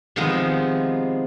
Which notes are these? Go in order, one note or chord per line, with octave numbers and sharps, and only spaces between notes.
C3 D#3 F3 G#3 B3